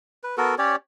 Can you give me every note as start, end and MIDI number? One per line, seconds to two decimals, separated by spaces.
0.23 0.36 71
0.38 0.55 59
0.38 0.55 66
0.38 0.55 69
0.38 0.55 70
0.58 0.76 61
0.58 0.76 67
0.58 0.76 73
0.58 0.76 74